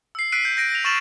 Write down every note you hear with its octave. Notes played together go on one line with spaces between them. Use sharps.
E6 C7
E6 F#6 B6 C7 D7 D#7
G6
G6 A#6 D7
A#6 F7
C#6 F6 A6 D#7 E7 F#7